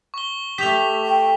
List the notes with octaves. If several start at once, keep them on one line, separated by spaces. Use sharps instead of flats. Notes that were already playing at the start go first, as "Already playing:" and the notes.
C#6 G7
A3 G4 B6 F7
G5